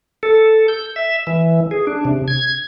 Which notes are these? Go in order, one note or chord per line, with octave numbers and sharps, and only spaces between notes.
A4
G6
E5
E3
G#4
D4
C3
G#6